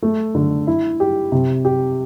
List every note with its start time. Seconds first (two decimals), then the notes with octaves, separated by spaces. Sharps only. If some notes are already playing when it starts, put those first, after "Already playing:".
0.02 A3
0.35 D3
0.67 E4
1.00 G4
1.32 C3
1.65 G4